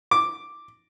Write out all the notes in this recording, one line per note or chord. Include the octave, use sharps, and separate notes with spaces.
D6